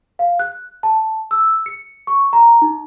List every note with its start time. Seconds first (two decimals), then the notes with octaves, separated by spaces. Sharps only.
0.19 F5
0.39 F#6
0.83 A5
1.31 E6
1.66 C#7
2.07 C#6
2.33 A#5
2.62 D#4